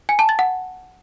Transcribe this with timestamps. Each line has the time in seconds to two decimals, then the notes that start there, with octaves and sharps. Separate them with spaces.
0.09 G#5
0.19 A5
0.29 A6
0.39 F#5